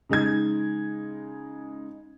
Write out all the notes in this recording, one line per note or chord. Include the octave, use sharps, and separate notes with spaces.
C#3 G#3 D#4 G#6